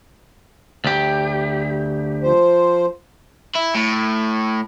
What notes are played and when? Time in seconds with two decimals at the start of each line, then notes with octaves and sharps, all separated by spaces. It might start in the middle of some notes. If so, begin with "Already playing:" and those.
0.84 D2 G4
2.23 F3 C5
3.55 E4
3.75 A2